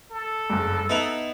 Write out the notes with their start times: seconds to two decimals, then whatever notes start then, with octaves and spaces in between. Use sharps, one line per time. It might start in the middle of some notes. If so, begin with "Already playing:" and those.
0.11 A4
0.50 F#1 G2
0.89 B3 D#4 E4 F7